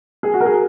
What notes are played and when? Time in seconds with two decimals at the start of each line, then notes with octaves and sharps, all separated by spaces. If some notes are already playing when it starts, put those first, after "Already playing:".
0.23 G#4
0.34 F#4
0.41 A#4
0.45 G#4